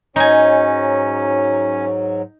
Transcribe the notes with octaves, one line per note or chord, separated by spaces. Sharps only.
G#2 F#3 C#4 D#4 G#5